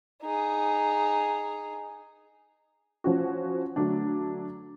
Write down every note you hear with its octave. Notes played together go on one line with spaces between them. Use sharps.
D#4 G#4
F3 C#4 F#4
D3 F#3 A3 D4